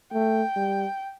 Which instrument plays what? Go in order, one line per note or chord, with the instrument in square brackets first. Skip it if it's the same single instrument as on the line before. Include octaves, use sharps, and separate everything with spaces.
[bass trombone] A3 [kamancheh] G5
[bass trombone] G3